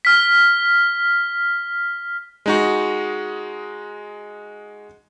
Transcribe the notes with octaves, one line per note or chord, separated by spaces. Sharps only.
F6 B6
G#3 D#4 F#4